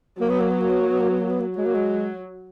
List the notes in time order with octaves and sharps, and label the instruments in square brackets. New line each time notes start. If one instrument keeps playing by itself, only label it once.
[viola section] F#3 [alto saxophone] A#3
[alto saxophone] B3
A#3
B3
A#3
B3
A#3
B3
A#3
B3
A#3
B3
A#3
[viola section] F#3 [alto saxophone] G#3
[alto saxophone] A#3
G#3